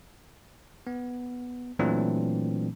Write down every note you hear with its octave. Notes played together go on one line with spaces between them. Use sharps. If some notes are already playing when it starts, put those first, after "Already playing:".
B3
A#2 E3 F#3 A3 C4 D4